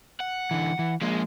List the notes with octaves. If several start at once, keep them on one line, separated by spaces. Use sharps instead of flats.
F#5
D3 E3
E3
F3 G#3 A#3